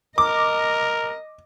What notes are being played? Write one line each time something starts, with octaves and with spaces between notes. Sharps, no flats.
A#4 D#5 D6